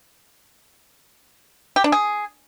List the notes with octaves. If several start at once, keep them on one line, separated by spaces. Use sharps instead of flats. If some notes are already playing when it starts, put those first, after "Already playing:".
G4
D4
G#4